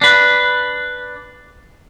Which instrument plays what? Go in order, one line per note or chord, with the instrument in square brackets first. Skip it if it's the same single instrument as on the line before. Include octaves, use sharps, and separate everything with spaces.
[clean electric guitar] D4 B4